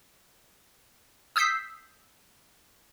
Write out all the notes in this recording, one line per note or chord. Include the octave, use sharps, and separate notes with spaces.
D#6 E6 G6 B6 C7